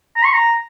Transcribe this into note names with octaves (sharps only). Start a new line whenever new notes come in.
A#5
C#6
A#5